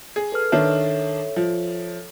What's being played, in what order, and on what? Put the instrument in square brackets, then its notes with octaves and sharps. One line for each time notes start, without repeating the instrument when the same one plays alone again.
[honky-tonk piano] G#4
[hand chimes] A4 B4 F6
[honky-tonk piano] D#3 D4 [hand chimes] A4 C#5 E5
[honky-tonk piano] F3